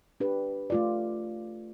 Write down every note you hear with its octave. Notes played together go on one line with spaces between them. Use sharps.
D4 G4 B4
A3 F4 D5